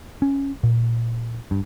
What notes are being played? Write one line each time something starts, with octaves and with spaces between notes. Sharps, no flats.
C#4
A#2
G2